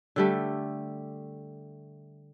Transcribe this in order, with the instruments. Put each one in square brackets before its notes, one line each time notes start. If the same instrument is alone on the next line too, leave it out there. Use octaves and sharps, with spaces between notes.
[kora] D3 G3 A3